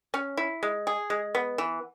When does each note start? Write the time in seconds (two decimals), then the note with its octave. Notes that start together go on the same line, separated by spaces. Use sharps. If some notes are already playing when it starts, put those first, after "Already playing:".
0.14 C#4
0.37 E4
0.63 G#3
0.87 G#4
1.10 G#3
1.35 B3
1.58 E3